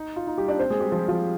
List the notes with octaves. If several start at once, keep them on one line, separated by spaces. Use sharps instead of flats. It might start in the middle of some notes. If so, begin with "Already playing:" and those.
Already playing: D#4
F4
D#4
G3 G4
D4 D5
C4 C5
G#3 G#4
G3 G4
F3 F4
F3 F4